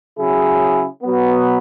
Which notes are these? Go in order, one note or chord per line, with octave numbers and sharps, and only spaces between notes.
C#3 F#3 E4 G#4
B2 F#3 B3